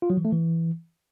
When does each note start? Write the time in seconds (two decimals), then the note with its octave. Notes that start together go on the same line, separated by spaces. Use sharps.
0.02 F4
0.10 F#3
0.17 E3
0.25 A3
0.32 E3